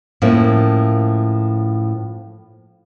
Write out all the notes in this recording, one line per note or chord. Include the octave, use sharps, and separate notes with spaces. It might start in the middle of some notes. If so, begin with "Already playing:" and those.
A2 F3 A#3 C#4